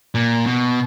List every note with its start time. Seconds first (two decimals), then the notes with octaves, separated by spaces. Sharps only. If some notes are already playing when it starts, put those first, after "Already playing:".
0.15 A#2
0.46 B2